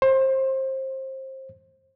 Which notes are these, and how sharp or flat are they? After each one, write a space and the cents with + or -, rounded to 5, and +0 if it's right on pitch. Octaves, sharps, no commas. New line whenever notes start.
C5 +25